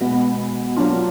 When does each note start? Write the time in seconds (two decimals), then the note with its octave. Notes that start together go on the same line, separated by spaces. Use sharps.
0.01 B2 G#3 B3
0.76 B2 F#3 A#3 D4 F4